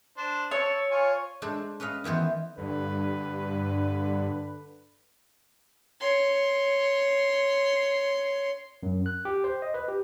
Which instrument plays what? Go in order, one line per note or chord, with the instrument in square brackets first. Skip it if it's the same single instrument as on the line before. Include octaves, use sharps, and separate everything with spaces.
[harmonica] D4 C5
[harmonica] A4 [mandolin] C#5
[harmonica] F4 G#5 C#6
[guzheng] G#3 D4 A4 C5
C#4 B4 D#5 F5
D#3 E3 B3 C5
[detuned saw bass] G2 [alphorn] D3 [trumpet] B4
[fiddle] C#5 C6
[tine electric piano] F#2
F#6
G4
C5
D#5
B4
G4